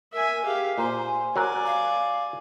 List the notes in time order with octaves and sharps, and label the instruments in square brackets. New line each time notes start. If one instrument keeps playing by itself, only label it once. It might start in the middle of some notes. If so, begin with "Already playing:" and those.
[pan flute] A#4 [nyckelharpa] E5 G#5
[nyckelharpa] G4 F5 [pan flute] G#4
[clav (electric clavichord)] A#2 [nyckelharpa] C5 [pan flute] G#5
[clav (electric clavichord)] F#3 A#4 A#5 [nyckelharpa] D5 G#5
[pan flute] F5